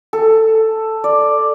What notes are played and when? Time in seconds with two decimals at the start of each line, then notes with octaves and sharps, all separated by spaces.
0.13 A4
1.04 D5